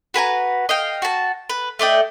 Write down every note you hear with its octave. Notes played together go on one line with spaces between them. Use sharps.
F#4 B4 G#5 A#5
D#5 F5 G5
F#4 A5
B4
A3 D5 D#5 G5